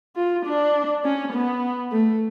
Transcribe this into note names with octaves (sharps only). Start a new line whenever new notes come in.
F4
D4
C#4
B3
A3